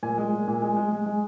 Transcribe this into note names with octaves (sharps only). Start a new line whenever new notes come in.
A#2 G#5
G#3
A#2
A#2
G#3
G#3
G#3
G#3